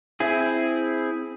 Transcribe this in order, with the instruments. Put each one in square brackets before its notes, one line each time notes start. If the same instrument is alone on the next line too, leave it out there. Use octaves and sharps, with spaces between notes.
[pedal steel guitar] C4 E4 G#4